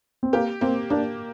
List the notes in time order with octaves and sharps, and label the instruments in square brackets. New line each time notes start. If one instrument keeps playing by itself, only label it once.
[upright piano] C4
[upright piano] A#3 [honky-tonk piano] G4
[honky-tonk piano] A#3 [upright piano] C4
[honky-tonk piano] A#3 [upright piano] D4